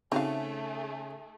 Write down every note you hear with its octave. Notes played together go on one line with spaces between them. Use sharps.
C#3 A3 C4 D#4 F#4 G#4 F5